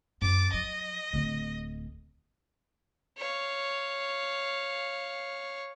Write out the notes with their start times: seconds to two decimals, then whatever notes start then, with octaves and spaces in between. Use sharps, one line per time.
0.22 F#2 D6 A6
0.53 F#3 D#5
1.13 D1 D3
3.18 C#5 F5